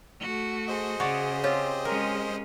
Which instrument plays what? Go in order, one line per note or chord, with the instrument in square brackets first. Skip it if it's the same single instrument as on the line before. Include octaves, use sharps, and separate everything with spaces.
[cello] A3 F#4
[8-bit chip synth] G#4 C5 D#5
[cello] C#3 [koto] F#4 C#5 D5
[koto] C4 F4 G4 [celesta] C#5
[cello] G#3 C#4 [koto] A#4